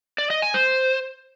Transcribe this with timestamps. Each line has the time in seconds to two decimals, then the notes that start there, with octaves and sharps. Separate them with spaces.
0.18 D5
0.30 D#5
0.42 G#5
0.54 C5